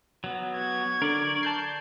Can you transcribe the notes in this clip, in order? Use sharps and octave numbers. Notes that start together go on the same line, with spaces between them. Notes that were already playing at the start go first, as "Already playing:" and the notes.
F#3 B3
C#6 G#6
D3 A#4 D5
A5 G6 C7